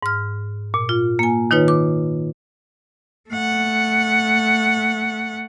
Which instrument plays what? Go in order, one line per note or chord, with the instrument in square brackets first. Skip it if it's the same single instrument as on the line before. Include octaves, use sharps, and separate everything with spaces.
[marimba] G#2 F6
A#2
F4
A#3 G#5
D#3 D#4 F4 B4 C#5
D6
[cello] A3 F#5